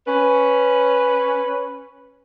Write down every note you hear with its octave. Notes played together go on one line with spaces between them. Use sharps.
C#4 B4